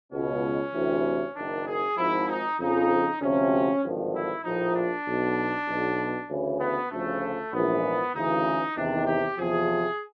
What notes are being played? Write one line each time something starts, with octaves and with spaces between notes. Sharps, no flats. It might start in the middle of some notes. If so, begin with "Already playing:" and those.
C#2 B2 C#4
D2 C3 E3
F#1 F#2 D#3 D4
G#4
G#1 G#2 F3 E4
D#4
F2 C#3 F3 D#4
D2 C3 F3 C#4
G#1 G2 D3 F3
E4
A#1 A2 F3 D#4
D4
B1 B2
B1 B2
D2 C#3 E3 C#4
B3
D2 C#3 F3 A3
A#1 G#2 E3 B3
D2 C#3 E3 D#4
E2 C3 D#3 D4
G4
E2 C3 F3 G#4